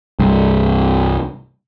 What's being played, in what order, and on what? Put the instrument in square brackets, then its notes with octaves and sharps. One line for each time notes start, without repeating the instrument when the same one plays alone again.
[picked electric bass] C2 G2